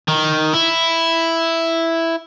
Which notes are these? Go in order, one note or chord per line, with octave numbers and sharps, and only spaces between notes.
D#3
E4